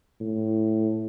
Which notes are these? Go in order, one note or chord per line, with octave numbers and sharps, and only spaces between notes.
A2